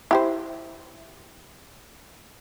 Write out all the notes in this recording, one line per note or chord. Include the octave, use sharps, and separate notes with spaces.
E4 G4 C5